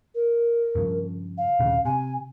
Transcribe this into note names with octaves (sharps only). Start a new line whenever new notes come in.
A#4
G2 C#3 F3
F5
D#1 C2 C#3
C3 G#5